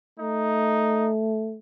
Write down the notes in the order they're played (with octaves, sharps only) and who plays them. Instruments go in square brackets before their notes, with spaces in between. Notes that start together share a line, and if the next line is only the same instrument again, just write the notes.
[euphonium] A3 [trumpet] D#4